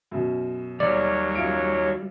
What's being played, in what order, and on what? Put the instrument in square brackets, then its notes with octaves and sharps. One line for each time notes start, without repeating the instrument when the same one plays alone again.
[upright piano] F#2 B2
[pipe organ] D#2 F#3 C#5 [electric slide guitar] G3 [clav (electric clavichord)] D5
[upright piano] F#2 F4 D7